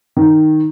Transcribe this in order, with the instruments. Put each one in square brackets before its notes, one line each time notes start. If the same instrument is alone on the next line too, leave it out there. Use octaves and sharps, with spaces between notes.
[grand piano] D#3